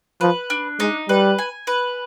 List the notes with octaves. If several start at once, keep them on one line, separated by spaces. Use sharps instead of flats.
F3 B4
D4
G#3 D#4
G3 B4
G#5
B4